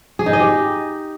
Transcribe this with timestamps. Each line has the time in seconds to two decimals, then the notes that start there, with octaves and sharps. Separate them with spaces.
0.19 G#4
0.26 D#4
0.33 D#5
0.40 G4